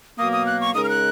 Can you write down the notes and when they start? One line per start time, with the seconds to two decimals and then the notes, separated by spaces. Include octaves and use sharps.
0.19 B2 F#3 A#3 D#6
0.32 D#6
0.46 F#6
0.61 C#6
0.74 C#3 G#3 D#4 A#4 D#6
0.84 F6
0.89 F#6